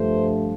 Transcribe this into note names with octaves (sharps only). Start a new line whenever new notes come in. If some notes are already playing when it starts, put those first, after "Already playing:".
Already playing: G2 F3 A3 C5